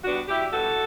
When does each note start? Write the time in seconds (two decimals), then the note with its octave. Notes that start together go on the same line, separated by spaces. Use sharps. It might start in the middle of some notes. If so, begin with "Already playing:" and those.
0.05 B2 G3 B3 D4 F#4
0.29 E4 G4
0.52 B2 G3 B3 F#4 A4